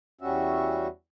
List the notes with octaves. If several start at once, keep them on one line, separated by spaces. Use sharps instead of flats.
E2 G3 C#4 F#4 E5